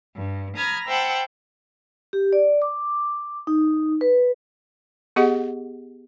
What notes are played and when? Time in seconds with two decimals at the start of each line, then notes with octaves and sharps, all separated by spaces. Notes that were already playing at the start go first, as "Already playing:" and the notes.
0.15 G2
0.56 A#5 B5 D#6 F6 G#6
0.87 C5 E5 F#5 G5 A5 B5
2.13 G4
2.33 D5
2.62 D6
3.47 D#4
4.01 B4
5.16 B3 G4 G#4 D#5 F#5